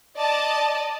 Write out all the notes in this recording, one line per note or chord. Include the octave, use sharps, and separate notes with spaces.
D5 D#5 A5